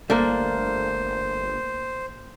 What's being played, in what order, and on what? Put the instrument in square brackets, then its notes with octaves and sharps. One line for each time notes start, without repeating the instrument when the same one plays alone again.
[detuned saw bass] G1 [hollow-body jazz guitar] A3 D4 A4 [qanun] A#3 [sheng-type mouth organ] C5